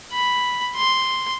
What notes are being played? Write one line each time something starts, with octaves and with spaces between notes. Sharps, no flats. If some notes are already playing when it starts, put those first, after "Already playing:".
B5
C6